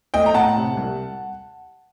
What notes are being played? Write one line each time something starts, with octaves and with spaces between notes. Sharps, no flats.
A3 D#5 G5
A#5
A2 F#5 A5
C3
C2